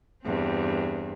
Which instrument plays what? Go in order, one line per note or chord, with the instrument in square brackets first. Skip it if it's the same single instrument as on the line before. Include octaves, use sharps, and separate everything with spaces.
[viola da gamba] E2 G2 C4